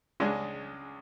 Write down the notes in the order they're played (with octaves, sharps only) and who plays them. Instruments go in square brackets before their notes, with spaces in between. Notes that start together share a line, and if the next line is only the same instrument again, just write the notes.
[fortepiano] C#2 C#3 G#3 D4 G#4